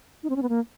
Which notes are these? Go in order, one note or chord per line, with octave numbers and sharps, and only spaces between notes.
D#4
C4
C#4
B3
A#3